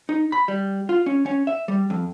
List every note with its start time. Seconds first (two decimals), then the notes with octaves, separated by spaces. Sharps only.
0.09 D#4
0.32 B5
0.48 G3
0.89 F4
1.06 C#4
1.26 C#4
1.47 E5
1.68 G3
1.90 F2